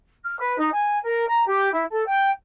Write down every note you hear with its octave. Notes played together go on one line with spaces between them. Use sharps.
F6
B4
D#4
G#5
A#4
A#5
G4
E4
A4
G5